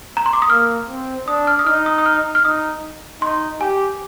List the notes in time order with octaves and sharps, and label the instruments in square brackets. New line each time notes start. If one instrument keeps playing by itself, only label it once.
[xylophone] A#5
C6
D6
D#6
[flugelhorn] A#3 [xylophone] F6
[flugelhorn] C4
[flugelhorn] D4 [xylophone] D#6
[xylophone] F6
D#6
[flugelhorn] D#4 [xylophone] F6
[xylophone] D#6
D#6
F6
F6
[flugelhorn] D#4 [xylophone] D#6
[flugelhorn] D#4 [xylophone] C6
[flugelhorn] G4 [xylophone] G#5